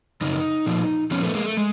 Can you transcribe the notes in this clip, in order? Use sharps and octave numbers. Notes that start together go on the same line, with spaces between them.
F#2 C#3 D#4
A#2 F3
A#2 F3 B3 C#4
A3 B3
G#3 A#3
A3
G#3